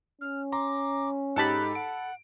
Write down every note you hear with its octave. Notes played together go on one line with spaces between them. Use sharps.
C#4 F6
A#5 C6 D6
G#2 D#4 G4 A4 A5 B5 F#6
F#5 D7